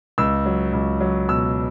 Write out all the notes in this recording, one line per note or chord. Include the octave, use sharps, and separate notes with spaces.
C#2 E6
F#3
C#2
F#3
B2 E6